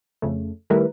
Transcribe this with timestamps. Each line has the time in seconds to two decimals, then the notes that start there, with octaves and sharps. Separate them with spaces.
0.22 F2 C#3 A3
0.70 D#3 G3 A3 E4 A#4 B4